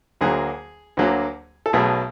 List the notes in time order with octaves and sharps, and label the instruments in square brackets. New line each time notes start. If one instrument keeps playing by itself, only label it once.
[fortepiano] D2 D3 F#3 A#3 G#4
D2 D3 F#3 A#3
A4
B1 B2 F#3 A3 G#4